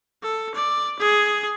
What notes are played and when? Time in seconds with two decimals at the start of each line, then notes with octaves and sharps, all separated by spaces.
0.23 A4
0.55 D5
0.99 G#4